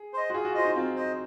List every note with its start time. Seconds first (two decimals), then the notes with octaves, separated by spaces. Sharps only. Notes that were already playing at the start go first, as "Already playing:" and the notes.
Already playing: G#4
0.13 C5 D#5
0.30 F#4
0.34 F4 G#4
0.45 F#4
0.54 F4 C5 D#5
0.65 D#4
0.75 C4 F4
0.96 C5 D#5